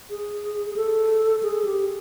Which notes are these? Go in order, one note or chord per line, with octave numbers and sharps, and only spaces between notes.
G#4
G#4
A4
G#4
G4